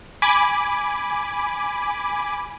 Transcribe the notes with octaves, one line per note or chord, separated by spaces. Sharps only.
G#5 B5 D6